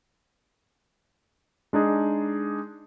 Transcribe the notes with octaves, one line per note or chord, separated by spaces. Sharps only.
G#3 D4 D#4 G#4